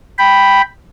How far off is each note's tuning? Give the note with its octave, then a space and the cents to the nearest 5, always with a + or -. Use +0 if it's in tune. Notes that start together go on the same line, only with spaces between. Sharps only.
G5 +0 B5 +0